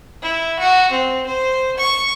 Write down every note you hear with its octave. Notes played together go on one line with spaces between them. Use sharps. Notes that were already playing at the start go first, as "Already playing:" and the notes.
E4
F#4
C4
C5
C#6